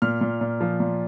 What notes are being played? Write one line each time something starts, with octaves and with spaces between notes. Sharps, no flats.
A#2 F6
A#2
A#2
F3
A#2